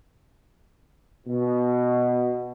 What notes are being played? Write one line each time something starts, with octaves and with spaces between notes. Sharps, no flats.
B2